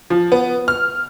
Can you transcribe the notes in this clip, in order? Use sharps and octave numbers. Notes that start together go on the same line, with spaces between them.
F3
B3
F6